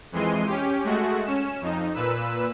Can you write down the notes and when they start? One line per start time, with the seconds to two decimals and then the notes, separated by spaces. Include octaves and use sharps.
0.12 F2 E3 G#3 C6 D#7
0.47 C#4 G4
0.84 G#3 A3 F#4
1.24 C#4 E7
1.61 F2 D#4
1.94 A#2 B4 E6